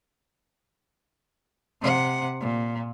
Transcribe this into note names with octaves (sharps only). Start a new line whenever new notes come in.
C3 F#5
A#2